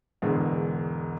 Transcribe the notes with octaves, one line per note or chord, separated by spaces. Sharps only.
E1 E2 G#2 D3 G#3